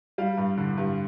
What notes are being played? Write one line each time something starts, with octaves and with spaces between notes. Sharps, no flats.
G3 F5
G2
D3
G2